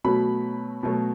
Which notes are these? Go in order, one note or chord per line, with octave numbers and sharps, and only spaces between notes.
B2 F#3 A3 B5
B2 F#3 A3